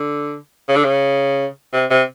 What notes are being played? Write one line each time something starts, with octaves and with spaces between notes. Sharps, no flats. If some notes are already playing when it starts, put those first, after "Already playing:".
Already playing: D3
C#3
D3
C#3
C3
C3